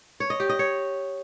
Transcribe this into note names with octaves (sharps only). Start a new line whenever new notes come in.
C#5
D#5
G4
D#5
C#5